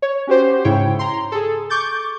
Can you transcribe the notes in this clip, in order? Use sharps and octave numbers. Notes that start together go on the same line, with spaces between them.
C#5
C#4 F#4 G4 C5
G#2 C#3 E4 C#5 G5
A#5 C6
G#4 A4
C#6 D6 G6 A6